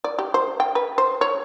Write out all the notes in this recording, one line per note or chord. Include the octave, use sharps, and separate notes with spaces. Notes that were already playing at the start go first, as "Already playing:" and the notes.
D5
G4
C5
G5
B4
C5
C#5